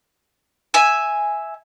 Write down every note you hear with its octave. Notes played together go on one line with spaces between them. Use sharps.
E5 G#5